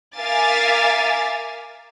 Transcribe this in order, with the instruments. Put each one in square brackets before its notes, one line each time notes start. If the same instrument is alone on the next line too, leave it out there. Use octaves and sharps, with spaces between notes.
[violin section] A#4 E5 F5 G#5 D6 A6